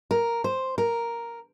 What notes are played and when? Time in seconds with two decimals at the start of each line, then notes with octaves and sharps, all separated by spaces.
0.11 A#4
0.44 C5
0.78 A#4